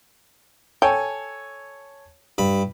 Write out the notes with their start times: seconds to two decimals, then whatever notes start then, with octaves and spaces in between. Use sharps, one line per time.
0.82 A4 C#5 G5 G#5
2.38 G2 B5